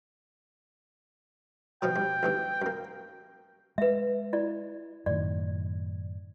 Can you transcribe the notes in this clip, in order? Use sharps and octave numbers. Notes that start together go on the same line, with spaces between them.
B2 F3 F#3 G5
G2
E2 G2 E3
F#2 A#3
G#3 B4 E5
E4 D5
F#2 A2 D#3 D5